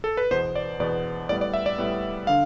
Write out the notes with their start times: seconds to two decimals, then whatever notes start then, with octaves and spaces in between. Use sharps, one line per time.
0.04 A4
0.17 B4
0.31 E2 B2 B3 C5
0.56 D5
0.80 E2 B2 B3 D5
1.29 A2 G3 B3 D5
1.41 D5
1.54 E5
1.66 D5
1.78 A2 G3 B3
2.27 D3 F5